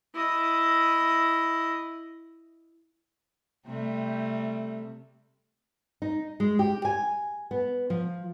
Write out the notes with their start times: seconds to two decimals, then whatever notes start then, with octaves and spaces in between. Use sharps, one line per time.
0.14 E4 D#5
3.66 C3 G3 A3
6.02 D#4
6.40 G#3
6.59 G4
6.85 G#5
7.51 B3
7.90 F3